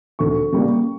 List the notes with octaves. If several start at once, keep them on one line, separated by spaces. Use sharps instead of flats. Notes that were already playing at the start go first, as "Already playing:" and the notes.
D2 C#6
C#3 G3 A#3